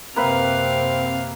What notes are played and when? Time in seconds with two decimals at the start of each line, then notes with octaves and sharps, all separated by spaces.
0.16 F#2 C3 A#3 C4 B4 E5 F5